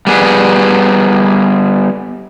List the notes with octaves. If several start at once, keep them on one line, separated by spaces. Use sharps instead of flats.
G3 B3 G#4